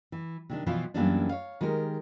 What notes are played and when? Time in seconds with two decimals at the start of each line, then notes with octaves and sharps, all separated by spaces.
0.12 E3
0.50 C3 D#3 D4
0.66 B2 E3 F3 E4 F4
0.94 F#2 E3 G3 A#3 B3 D4
1.29 C#5 F5
1.61 D#3 G#3 G4 A#4